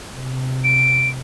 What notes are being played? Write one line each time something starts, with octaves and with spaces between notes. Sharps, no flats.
C3
D7